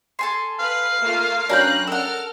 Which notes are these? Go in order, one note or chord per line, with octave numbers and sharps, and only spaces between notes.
A4 G#5 C6
B4 F5
A3 A#3 F4
F#3 C#4 D4 A#4 B4 G5 A#5 F#6
A4 A#4 F#5 F6